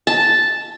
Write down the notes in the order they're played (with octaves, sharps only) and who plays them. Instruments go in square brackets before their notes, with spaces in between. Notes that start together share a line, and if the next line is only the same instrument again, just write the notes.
[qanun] A5